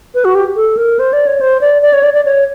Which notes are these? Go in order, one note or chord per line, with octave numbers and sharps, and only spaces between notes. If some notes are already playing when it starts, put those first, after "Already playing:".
B4
F#4
G4
A4
A#4
C5
D5
C#5
C5
D5
D5
C#5
D5
D5
C#5